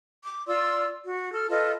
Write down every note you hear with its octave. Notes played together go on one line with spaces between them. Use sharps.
D6
F4 D5 C6 E6
F#4
A4 F6
F4 A4 B4 D#5